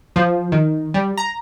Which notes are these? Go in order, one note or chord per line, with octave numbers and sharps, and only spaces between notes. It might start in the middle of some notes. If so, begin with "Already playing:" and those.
F3
D#3
G3
A#5